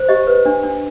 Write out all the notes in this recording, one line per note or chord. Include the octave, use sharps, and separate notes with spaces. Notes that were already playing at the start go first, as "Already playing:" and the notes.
Already playing: C5
G4 D#5
B4
D4
D4